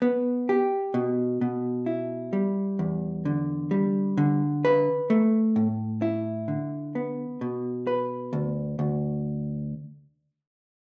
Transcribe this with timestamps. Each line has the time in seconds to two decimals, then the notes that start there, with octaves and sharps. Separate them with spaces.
0.02 B3
0.49 G4
0.94 B2
1.41 B2
1.86 E4
2.33 G3
2.79 E2
3.25 D3
3.71 G3
4.17 D3
4.65 B4
5.10 A3
5.56 A2
6.02 E4
6.48 D3
6.95 B3
7.41 B2
7.87 B4
8.33 D2
8.79 D2